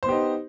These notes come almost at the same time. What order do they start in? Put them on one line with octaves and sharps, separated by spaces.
C5 B3 G4 D#4